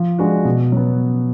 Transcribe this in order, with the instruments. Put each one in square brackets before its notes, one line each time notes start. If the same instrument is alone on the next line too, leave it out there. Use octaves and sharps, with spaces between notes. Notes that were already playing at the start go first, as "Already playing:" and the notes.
Already playing: [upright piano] F3
G#3 D4 F#4
B2
F#3 B3